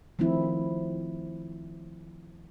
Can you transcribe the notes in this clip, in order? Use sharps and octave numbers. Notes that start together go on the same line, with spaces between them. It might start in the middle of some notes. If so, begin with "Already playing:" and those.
D#3 F3 A3 C4 E4